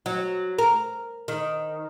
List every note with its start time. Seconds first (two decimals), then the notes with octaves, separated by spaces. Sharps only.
0.06 F#3
0.59 A#4
1.28 D#3